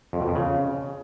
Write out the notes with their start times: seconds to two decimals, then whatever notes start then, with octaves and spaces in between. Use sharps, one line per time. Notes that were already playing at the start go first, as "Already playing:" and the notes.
0.13 F2
0.21 B2
0.28 F2
0.35 C#3